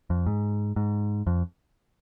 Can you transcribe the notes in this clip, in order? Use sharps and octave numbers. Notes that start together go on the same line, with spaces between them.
F2
G#2
G#2
F2